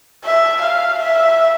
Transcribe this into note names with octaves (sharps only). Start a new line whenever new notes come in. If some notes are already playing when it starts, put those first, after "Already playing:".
E5
F5
E5